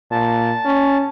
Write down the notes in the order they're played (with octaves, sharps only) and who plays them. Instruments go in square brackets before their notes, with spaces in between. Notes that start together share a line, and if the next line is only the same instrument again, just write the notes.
[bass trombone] A#2 [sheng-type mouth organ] A5
[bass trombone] C#4